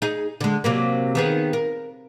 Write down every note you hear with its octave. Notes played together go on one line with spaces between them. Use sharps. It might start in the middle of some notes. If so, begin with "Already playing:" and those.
D#4 G#4
D3 G#3
C3 F#3 A#3
D#3 B3 G#4
A#4